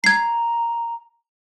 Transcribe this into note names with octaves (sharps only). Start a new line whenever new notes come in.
A#5 G#6 C7